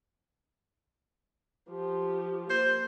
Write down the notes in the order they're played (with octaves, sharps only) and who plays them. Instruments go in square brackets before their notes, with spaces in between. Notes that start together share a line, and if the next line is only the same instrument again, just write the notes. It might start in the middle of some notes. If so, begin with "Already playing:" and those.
[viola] F3 G4
[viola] A#3 [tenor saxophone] C5